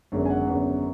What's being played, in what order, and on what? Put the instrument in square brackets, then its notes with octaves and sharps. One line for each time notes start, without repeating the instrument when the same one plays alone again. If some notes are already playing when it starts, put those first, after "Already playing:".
[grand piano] G#1 F#2 D3 G#3 B3
G#5
F#5
G#1 F#2 D3 G#3 B3